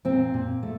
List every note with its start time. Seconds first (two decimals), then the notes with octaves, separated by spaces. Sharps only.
0.05 A#2 C4
0.34 A#2
0.63 A3